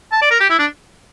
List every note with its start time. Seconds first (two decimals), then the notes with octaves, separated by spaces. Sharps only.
0.12 A5
0.22 D5
0.31 A#4
0.40 G4
0.50 E4
0.59 D4